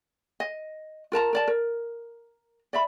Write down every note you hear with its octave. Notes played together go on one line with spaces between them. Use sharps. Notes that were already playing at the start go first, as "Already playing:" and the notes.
D#5
F4 A#4 A5 A#5
A#4 D5 A5
A#4
D5 E5 B5